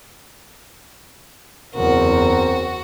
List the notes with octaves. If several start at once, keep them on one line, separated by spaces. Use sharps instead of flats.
F#1 E2 C4 F#4 A#4